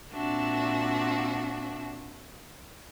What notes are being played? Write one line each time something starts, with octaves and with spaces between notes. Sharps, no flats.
A#2 C4 D4 F#4 E5